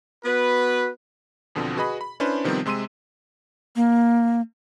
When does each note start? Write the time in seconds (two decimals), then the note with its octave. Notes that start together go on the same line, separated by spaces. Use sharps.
0.25 B3 F#4 B4
1.55 E2 B2 D3 F3 C4
1.77 F#4 G#4 B4 D#5 B5
2.01 B5
2.20 C#4 D4 E4 B4 C5
2.44 C3 D#3 F3 G3 B3 C4
2.66 C3 G#3 C6 E6 D#7
3.76 A#3